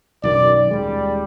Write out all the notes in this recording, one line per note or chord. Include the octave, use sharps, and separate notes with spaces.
B1 F#2 D#3 D5
D#1 G3 G#3